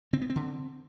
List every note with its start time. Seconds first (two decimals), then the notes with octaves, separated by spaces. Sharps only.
0.13 D3 C4
0.22 B3
0.30 C4
0.36 D3